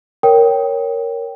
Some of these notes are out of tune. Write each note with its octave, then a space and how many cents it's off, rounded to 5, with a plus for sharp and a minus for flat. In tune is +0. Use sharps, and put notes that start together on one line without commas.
A#4 +0 C#5 +0 G5 +0